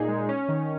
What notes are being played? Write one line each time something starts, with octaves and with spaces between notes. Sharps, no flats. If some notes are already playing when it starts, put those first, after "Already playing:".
Already playing: A#2 D#4 G#4
G#3
C#4
D#3